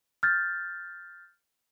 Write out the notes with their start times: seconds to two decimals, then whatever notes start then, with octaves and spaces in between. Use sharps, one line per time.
0.23 F6 G6 A6